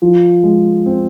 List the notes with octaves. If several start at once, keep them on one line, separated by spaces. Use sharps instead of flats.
F3
G#3
C4